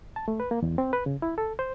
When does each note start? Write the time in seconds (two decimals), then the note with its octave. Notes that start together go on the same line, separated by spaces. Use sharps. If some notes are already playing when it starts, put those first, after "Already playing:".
0.16 A5
0.28 A3
0.40 B4
0.51 A#3
0.62 E2
0.78 C4
0.93 B4
1.06 C#3
1.22 E4
1.38 A4
1.59 C5